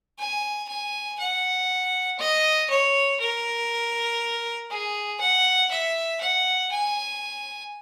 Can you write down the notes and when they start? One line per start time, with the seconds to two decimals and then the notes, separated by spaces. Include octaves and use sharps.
0.18 G#5
0.68 G#5
1.19 F#5
2.19 D#5
2.70 C#5
3.20 A#4
4.71 G#4
5.20 F#5
5.71 E5
6.21 F#5
6.72 G#5